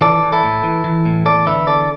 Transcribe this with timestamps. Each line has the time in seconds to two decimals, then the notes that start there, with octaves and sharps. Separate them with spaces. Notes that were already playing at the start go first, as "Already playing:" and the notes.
0.01 E3 A4 D5
0.23 E3
0.32 E4 A4
0.43 A2
0.64 E3
0.84 E3
1.05 A2
1.26 E2 A4 D5
1.46 D3 B4 E5
1.67 E2 A4 D5